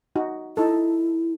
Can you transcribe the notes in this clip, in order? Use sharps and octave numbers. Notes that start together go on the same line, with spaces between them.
D#4 F#4
D#4 E4 A4